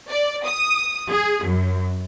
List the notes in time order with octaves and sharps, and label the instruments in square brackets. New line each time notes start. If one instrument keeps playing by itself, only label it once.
[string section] D5
D#6
G#4
F#2